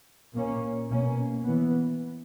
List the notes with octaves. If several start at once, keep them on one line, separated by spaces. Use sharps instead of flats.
A#2 A#3 C#4
B2 A#3 C#4
E3 B3